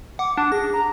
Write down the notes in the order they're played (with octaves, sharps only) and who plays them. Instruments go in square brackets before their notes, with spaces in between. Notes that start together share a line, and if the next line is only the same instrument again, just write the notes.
[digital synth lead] F#5 [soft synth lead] D6
[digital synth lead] D4 [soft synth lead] D6
[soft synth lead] G#4 [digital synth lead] A#6
[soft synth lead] A#5